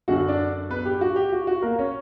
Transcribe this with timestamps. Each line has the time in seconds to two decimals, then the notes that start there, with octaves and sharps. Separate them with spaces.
0.08 F#2 D3 F#4 F#5
0.28 D4 D5
0.70 B3 B4
0.85 G4
1.01 F#4
1.16 G4
1.32 F#4
1.47 F#4
1.62 A#3 A#4
1.79 C#4 C#5